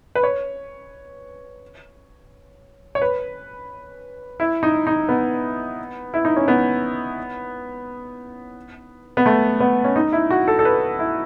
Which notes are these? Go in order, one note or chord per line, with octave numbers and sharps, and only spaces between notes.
B4
C#5
C#5
B4
E4
D#4
D#4
B3
E4
D#4
C#4
B3
B3
A3
B3
C#4
D#4
E4
F#4
A4
A4
B4
E4